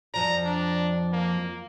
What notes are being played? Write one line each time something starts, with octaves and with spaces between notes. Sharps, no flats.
F2 F3 D5 A#5
D4
A#3